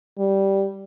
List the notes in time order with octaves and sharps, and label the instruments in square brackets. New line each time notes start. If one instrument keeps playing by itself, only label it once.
[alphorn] G3